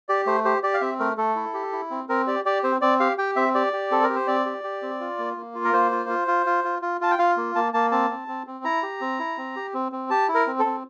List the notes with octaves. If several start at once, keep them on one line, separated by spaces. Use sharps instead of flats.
G4 D5
A3 C5
G4 C5
G4 D5
F5
C4 E5
A3 A#4
A3 A4
E4
G4
E4
C4
C4 A#4
G4 D5
G4 D5
C4 C5
C4 D5
G4 F5
G4 G5
C4 E5
G4 D5
G4
C4 A4
A#4
G4
C5
C4 D5
G4
G4
C4
F4
A#3
A#3
F4
A#4
A#3 C5
F4
F4
F4
F4
F4
F4
F4 A5
G5
F4 F5
A#3
A#3 A5
A#3 A5
C4 A5
C4
C4
C4
E4 A#5
G4
C4
E4
C4
G4
C4
C4
G4 A5
E4
A#4
C4
A4
C4